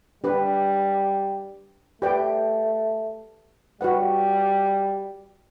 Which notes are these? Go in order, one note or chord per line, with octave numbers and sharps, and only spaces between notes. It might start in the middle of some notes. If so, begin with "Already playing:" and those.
G3 D4 G4 B4
A3 G4 B4 D5 G5
G3 F#4 B4 F#5